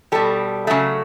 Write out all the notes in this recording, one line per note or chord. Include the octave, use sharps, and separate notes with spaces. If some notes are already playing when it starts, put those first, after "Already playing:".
B2 G3 A4
C#3 F#3 A3